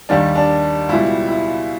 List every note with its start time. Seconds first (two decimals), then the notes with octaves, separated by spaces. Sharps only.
0.09 D#2 D#3 G3 D4
0.35 D4
0.89 C#2 B2 G3 E4
1.29 E4